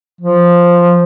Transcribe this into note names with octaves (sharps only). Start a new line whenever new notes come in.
F3